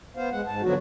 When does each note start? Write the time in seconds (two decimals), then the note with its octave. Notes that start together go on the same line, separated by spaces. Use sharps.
0.16 B3 C5 F5
0.32 G#3 F#5
0.47 G#2 A5
0.62 D3 F3 F#3 B3 F#4